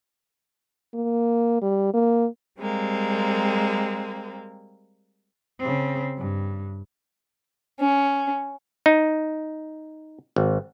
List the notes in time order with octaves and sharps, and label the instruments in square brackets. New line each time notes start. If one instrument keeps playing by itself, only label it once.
[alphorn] A#3
G3
A#3
[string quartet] G3 G#3 A#3 C4
[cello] C#3 C4
G2
[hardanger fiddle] C#4
[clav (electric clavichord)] D#4
G#1